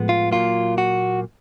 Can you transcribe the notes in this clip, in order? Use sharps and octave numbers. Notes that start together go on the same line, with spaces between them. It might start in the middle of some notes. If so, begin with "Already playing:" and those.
Already playing: A2 F3 G#3 B3
F4
A#2 F#3 A#3 F4
F#4